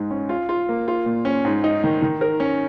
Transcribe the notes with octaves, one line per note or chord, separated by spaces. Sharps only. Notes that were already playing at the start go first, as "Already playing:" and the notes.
Already playing: G#2 G#3
C#4
F4
F4
A#3
F4
A#2
C#4
G#2
D#4
D#3
D#3
A#4
C#4